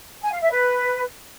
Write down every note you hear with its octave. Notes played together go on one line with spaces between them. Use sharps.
G#5
F5
E5
B4